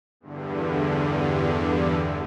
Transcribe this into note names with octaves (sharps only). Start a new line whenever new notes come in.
E2 G2 D3